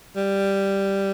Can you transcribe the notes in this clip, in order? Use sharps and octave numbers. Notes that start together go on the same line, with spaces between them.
G3